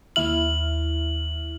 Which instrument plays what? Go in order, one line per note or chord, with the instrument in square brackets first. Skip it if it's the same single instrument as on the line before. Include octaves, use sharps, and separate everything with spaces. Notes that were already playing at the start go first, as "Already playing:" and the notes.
[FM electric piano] D#2 E4 F6 [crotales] F#7